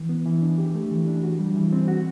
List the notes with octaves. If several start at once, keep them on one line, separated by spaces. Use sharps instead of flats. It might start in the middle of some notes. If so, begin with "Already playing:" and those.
Already playing: E3
B3
E3
D4
G4
A3
E3
D4
F#4
G3
E3
C4
F#4